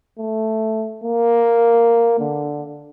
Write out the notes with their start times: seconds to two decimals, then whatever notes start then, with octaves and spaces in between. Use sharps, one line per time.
0.19 A3
1.04 A#3
2.20 D3